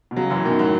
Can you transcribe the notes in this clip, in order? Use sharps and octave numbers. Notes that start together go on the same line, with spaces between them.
B2
C#3 F#3
F#2 E3
B2 D#3
A2 F#3